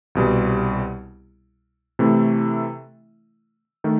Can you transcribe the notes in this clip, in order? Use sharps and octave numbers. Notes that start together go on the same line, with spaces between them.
C2 B2 G3
C3 E3 A3 E4
D#3 A3